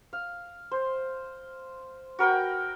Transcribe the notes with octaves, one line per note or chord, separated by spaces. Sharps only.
F5
C5
F#4 A#4 B4 G5